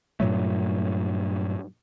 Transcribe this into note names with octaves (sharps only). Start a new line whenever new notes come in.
G2 A#2 F#3 A3